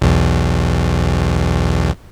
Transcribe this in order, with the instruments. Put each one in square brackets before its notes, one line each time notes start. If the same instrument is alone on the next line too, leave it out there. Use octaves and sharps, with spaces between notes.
[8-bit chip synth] B1 E2